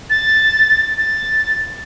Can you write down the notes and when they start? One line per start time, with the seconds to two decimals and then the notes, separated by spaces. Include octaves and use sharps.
0.10 A6
0.98 A6